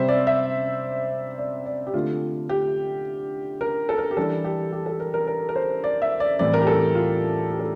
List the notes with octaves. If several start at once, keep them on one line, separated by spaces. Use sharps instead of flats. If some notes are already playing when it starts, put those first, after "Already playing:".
Already playing: C3 G3 C4 C5 E5
D5
E5
D5
D5
G4
D3 A3 C4 F4
G4
A#4
A4
A#4
G4
E3 G3 D4 A4
G4
G4
A4
A#4
A#4
A#4
A#4
C5
D5
E5
D5
A2 E3 G3 C4 D5
A#4
G4
A4
F4
G4
A4